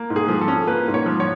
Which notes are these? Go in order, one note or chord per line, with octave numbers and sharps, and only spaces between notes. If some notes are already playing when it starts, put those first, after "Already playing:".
Already playing: A#3
G#2
G#4
F3
A4
C#4
A#3 B4
G#2
C#5
F3
C#5